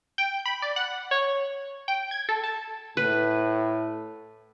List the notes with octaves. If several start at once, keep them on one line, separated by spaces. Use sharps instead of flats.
G5
B5
D5
F#5
C#5
G5
G#6
A4
A5
A2 B4